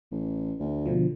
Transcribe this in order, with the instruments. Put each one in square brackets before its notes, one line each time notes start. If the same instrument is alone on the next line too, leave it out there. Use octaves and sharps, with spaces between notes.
[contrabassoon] A1
D2
[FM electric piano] B2 D3 F3